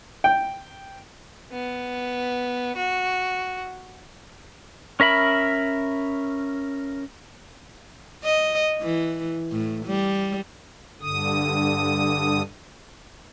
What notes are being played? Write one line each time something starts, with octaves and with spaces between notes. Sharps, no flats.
G5
B3
F#4
C#4 A#4 E5 B5
D#5
E3
A2
G3
G2 D3 D#6